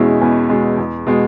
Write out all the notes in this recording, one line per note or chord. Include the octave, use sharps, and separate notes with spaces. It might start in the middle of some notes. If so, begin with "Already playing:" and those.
Already playing: E2 B2 G#3 C#4 E4
E2
B2 G#3
E2
B2 G#3